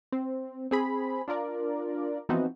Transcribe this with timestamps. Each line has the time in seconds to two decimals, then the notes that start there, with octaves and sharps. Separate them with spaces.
0.12 C4
0.71 C4 G#4 B5
1.28 D4 F4 A#4 D5
2.29 E3 F3 B3 C4 D#4 F#4